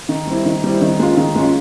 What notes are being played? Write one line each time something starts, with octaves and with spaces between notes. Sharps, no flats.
D#3
G3 C4 E4
D#3
G3 C4 E4
D#3
G#3 C#4 F4
D#3
G#3 C#4 F4